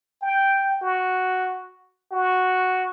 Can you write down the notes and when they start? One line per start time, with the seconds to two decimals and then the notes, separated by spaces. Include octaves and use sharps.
0.22 G5
0.82 F#4
2.12 F#4